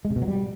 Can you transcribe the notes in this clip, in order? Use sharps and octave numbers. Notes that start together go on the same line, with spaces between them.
G#3
C3
B2
F#3
G3